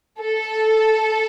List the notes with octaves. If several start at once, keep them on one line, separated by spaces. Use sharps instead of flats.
A4